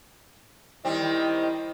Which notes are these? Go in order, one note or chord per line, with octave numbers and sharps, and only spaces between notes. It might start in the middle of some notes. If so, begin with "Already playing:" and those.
D#3 G3 C4 E4 D#5